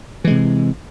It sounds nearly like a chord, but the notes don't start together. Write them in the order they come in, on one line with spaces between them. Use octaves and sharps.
E3 G#3 C3